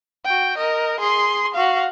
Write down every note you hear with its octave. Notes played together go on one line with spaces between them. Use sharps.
F#4 G5
A#4 D#5
G#4 C6
F#4 F5